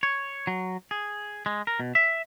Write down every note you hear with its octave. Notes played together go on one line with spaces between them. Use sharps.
C#5
F#3
G#4
G#3
A#4
B2
E5